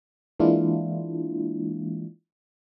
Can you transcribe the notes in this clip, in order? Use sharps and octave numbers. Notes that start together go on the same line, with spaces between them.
E3 G#3 A#3 D4 E4 F4